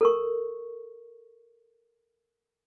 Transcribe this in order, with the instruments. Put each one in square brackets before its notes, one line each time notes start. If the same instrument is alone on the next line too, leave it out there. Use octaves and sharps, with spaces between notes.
[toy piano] A4 A#4 C#6